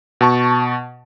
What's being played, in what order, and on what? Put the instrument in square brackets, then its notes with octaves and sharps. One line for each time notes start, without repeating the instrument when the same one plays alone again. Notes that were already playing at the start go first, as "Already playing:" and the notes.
[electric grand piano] B2 A5 C#6